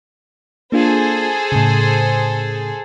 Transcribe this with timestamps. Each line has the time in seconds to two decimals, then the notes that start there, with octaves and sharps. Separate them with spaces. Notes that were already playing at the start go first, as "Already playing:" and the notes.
0.72 A#3 D4 F4 G#4 A4 C5
1.52 A2 C#3